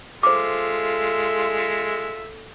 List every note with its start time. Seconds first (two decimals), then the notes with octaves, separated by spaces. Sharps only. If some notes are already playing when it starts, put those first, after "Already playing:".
0.23 G#3 F4 A4 C5 E5 D6